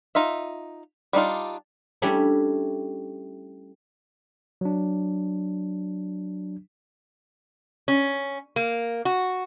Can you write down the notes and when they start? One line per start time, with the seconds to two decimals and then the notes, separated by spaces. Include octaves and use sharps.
0.15 D#4 F4 E5
1.13 G3 D4 D#4 F4
2.02 G3 A3 C#4 D4 E4 C#5
4.61 F#3 D4
7.88 C#4
8.56 A#3
9.05 F#4